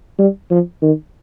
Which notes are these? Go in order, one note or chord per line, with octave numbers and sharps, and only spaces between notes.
G3
F3
D#3